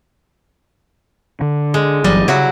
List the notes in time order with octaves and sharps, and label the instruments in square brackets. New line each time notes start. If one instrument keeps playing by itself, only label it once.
[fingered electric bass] D3
[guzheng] G#3
[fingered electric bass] G1 E3 F#3 [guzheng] G3 D#5
[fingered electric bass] C#3 [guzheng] F#3 E4 F#4